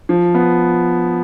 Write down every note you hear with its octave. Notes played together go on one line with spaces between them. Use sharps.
F3
B3